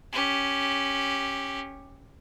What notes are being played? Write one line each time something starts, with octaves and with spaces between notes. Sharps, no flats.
C#4 G4